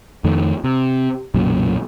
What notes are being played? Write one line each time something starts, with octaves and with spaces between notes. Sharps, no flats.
F2 D#3 A3
C3
B1 F#2 A#2 C#3